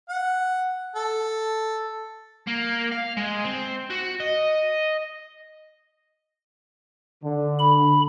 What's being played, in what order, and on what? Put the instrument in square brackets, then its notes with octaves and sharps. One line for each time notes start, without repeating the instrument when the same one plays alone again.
[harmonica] F#5
A4
[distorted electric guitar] A#3
F5
G#3
C4
F#4
D#5
[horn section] D3
[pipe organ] B5